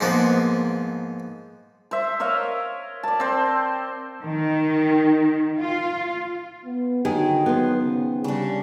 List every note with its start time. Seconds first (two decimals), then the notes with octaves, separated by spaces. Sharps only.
0.01 G#2 F3 A#3 B3
1.91 C5 E5
2.20 A#4 C#5 D#5 F5
3.03 D5 A5
3.20 C4 C5
4.23 D#3
5.60 F4
6.65 B3
7.05 D3 D#3 F#3 G#4
7.46 B3 C5
7.81 C#3
8.24 C#3 G3 D4